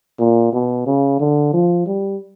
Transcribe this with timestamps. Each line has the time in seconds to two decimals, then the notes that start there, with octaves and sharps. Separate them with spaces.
0.19 A#2
0.53 B2
0.86 C#3
1.20 D3
1.53 F3
1.86 G3